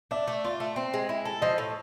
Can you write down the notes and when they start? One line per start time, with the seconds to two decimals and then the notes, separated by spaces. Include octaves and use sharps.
0.11 D4 E5
0.28 A3
0.44 F4 D5
0.60 A3
0.76 C4
0.94 G#3
1.09 E4
1.25 A4
1.42 F3 D#5
1.58 A2